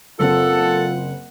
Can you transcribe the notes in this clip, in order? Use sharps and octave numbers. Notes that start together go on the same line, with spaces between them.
F#1 C4 F4 A4 F#5